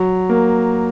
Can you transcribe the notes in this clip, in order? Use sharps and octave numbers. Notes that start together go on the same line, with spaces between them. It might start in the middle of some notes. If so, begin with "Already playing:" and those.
Already playing: F#3
A#3